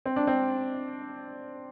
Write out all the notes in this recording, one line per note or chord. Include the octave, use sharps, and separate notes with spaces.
C4
D4
C4